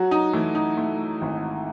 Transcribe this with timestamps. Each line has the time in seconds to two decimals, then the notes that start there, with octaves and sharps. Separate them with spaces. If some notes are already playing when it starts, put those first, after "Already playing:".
Already playing: F#3 F#4
0.11 D#4
0.33 E3 A3 E4
0.55 D#4
0.77 A3
1.21 G#1